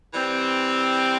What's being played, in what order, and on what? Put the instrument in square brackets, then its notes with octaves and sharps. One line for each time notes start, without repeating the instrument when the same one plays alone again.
[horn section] E3 G3 C4